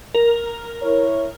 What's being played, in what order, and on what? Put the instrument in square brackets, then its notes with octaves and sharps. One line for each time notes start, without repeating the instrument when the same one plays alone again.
[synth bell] A#4
[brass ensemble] E4 C#5